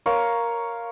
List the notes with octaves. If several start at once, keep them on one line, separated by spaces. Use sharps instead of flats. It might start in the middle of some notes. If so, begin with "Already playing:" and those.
A#4 C#5 F5 C6